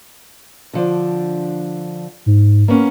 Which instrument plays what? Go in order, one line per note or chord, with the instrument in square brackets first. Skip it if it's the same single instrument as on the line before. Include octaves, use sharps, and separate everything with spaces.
[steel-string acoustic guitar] D3 F3 D4
[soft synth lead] G#2
[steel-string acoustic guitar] A#3 B3 C#4